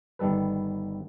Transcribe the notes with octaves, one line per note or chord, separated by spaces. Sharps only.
G1 D#3 G3 A4 B4